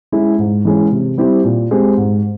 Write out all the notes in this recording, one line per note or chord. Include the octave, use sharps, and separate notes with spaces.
G#3 C#4 E4
G#2
E3 G#3 C#4
C3
G3 C4 E4 G4
A#2
G#3 C4 G4
G#2